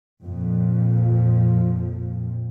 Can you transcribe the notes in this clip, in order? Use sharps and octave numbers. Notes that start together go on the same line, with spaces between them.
F2 A#2 F3